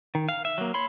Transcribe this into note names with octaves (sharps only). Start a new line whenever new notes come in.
D#3
F5
E5
F#3 A#3
C#5 B5 C6